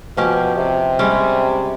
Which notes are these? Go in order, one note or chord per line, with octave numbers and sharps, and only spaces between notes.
B2 F3 C#4 G4
C3
G3 G#3 C#4